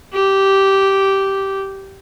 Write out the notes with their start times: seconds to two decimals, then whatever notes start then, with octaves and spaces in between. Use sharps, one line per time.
0.13 G4